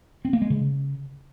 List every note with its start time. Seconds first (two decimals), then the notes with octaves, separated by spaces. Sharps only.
0.25 C4
0.33 A#3
0.42 G#3
0.50 C#3